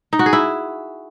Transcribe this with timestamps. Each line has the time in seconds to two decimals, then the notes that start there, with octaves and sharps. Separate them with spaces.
0.13 D#4
0.19 F#4
0.26 G#4
0.33 E4